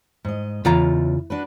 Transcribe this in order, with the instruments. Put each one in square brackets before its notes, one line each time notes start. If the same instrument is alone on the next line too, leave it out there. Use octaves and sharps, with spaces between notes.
[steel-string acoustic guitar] G#2 D#5
[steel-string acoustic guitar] E2 [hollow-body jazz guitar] C#3 F4 A#5
[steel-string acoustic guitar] D4 F#4 B4